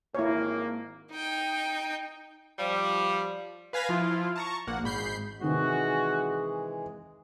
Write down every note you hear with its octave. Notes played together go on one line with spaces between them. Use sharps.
G#1 A#3 E4 C#5
D#4 G5
F3 G3
B4 F5 G#5 A#6 B6
F3 E4 F4
A5 A#5 C#6
A#1 A#3 F#5
G#1 G#2 B5 G6 C7
C3 D#3 E3 G#3 C4 F#4 G#4